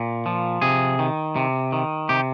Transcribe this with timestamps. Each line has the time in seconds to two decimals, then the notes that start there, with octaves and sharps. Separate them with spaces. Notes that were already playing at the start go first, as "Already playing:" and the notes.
Already playing: A#2
0.26 F3
0.62 C3 G#4
0.99 D#3
1.36 C3
1.72 D#3
2.09 C3 G4